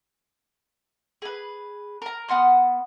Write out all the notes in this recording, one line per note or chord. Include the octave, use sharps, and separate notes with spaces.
G#4 B4
A#4 A#5
B3 F#5 C6 F6